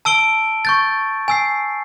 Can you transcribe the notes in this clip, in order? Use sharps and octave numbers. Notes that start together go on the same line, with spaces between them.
A5 E6 D7 G7
C#6 G6 A6
G#5 E6 C7